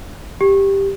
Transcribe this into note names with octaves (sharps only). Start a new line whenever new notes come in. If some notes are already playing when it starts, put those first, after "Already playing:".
G4